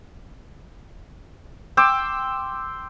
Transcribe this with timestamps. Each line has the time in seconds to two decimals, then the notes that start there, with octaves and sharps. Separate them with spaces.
1.77 G5 C6 D6 E6